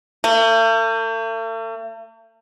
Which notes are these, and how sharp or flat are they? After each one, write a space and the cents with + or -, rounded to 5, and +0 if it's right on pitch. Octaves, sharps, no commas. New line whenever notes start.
A3 +45